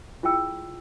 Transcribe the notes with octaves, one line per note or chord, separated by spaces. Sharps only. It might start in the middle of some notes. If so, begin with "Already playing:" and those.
E4 F4 G#4 G5 E6